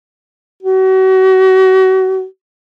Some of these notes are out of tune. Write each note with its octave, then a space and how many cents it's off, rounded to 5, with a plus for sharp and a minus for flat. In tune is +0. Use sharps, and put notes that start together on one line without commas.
F#4 +35